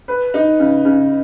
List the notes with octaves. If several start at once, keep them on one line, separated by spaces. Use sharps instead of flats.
B4
D#4
C#3
C#3